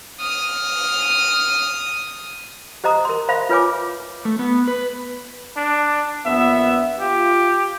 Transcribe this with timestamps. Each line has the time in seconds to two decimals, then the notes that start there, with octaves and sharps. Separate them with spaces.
0.20 D#6 F6
2.84 G4 C5 D#5 A#5 D#6
3.05 A#4 C6
3.28 C5 E5 F5 B5
3.49 F4 B4 C#5 G#5 D6
4.25 A3
4.39 B3
4.68 B4
5.57 D4
6.25 A#1 B3 E5
6.99 F4 G4